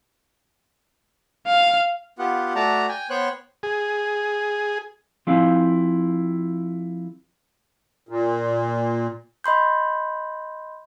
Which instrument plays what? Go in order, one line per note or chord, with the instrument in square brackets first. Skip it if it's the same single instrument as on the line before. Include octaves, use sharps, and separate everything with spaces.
[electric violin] F5
[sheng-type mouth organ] B3 F4 G4 F#5
A3 F#4 D5 A5 A#5
G5 G#5
B3 C5 C#5 G5 F#6
[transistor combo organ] G#4
[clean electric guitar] F3 C4 E4 G#4 F5
[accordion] A#2
[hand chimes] D#5 B5 C6 G6